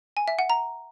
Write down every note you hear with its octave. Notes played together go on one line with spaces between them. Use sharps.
G#5
E5
F#5
A#5